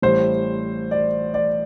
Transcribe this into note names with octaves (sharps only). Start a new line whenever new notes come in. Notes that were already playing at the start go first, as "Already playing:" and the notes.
A1 A2 G3 C5
D5
D5